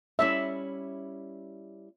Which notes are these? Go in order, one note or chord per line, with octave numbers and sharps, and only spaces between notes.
G3 C#4 E4 E5